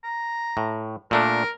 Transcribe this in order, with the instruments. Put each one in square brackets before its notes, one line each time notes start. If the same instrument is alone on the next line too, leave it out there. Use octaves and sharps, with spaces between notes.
[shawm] A#5
[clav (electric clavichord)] A2
[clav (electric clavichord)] A#2 A3 D4 [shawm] A#4